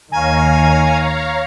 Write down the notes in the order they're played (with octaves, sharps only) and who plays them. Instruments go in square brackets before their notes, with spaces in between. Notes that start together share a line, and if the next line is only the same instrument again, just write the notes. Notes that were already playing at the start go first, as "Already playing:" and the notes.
[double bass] D#2 D#3 [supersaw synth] C#5 F5 A#5 [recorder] G#5